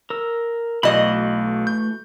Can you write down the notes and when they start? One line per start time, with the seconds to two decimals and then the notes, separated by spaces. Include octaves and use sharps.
0.10 A#4 E6
0.83 B1 E3 A3 F#4 D#5 B5
1.67 G6